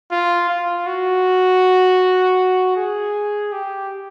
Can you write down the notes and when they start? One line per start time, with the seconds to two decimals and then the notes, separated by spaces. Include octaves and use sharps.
0.11 F4
0.49 F4
0.87 F#4
2.76 G#4
3.52 G4